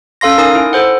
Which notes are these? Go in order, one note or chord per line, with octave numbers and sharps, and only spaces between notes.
C#4 A4 F5 C6 A#6
D#4 A#4 G#5 D#6
E4
A4 C5 F#5